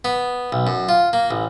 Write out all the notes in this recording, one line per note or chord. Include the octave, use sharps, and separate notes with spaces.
B3
B1
F#2
F4
A#3
A1